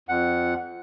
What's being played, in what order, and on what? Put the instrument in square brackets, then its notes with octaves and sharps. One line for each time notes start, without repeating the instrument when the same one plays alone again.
[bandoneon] F2 F#5